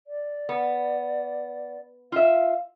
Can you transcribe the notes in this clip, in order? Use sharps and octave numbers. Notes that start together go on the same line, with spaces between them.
D5
B3
F4 E5 F5